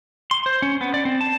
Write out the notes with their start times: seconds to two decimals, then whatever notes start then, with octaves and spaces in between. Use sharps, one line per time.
0.31 C6
0.46 C5
0.62 C#4
0.81 B3
0.94 D5
1.05 C4
1.21 A5